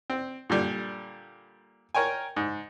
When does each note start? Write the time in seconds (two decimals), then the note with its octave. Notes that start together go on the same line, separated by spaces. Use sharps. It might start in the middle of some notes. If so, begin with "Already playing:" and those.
0.10 C4
0.50 A#2 D3 G3
1.95 A#4 C#5 G5 G#5
2.36 G#2